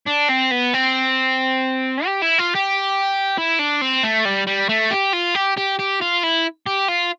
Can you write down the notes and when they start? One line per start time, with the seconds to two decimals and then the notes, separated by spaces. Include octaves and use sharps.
0.07 D4
0.30 C4
0.51 B3
0.74 C4
2.06 G4
2.22 E4
2.39 F4
2.55 G4
3.38 E4
3.59 D4
3.81 C4
4.03 A3
4.25 G3
4.47 G3
4.69 A3
4.91 G4
5.13 F4
5.35 G4
5.57 G4
5.79 G4
6.01 F4
6.23 E4
6.66 G4
6.88 F4